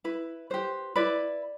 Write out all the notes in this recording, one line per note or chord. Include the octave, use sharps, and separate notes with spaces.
E4 B4
G4 B4 C5
E4 B4 D5